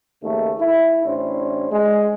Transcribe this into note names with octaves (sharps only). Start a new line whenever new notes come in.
D#2 C#3 G#3 A3
E4
A1 A2 C#4 D4 C5
G#3